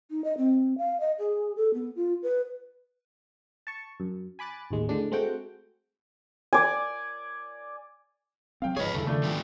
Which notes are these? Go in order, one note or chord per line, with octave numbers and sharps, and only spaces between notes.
D#4
D#5
C4
F5
D#5
G#4
A4
B3
F4
B4
A5 C#6
F#2
G#5 B5 D6 F#6 A6
A1 D#2 G#3
A2 D3 G#3 D4
G#3 A3 C4 F#4 F#5 G5
D5 G#5
F#3 C4 F5 G5
G1 G#2 F3 G#4 B4 C#5 D#5
E2 G2 C#3 E4 A4
D#3 F3 A3 D4
G#3 B3 F4